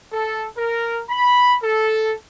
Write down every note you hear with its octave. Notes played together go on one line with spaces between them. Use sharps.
A4
A#4
B5
A4